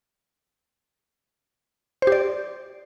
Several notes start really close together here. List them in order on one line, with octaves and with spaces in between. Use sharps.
C5 G4 D5